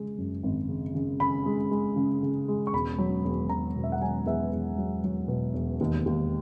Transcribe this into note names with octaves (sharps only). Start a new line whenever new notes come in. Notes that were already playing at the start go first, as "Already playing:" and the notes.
Already playing: C#3 G#3
F#2
G#1
C#3
C#3
C#3 B5
G#3
G#3
C#3
C#3
G#3
C#6
E1 B5
F#3
E1
E1 A#5
B2
E5
F#5
F#3 G#5
E2 E5
E2
F#3
F#3
B2
E1
D#2
D#2